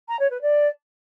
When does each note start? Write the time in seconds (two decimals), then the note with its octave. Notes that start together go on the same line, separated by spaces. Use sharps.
0.08 A#5
0.19 C#5
0.31 B4
0.42 D5